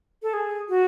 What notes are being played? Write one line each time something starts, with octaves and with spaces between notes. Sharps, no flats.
A4
G#4
F#4